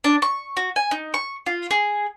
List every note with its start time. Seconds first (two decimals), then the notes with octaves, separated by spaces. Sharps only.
0.04 D4
0.22 C#6
0.57 F#4
0.76 G#5
0.91 D#4
1.14 C#6
1.46 F4
1.71 G#4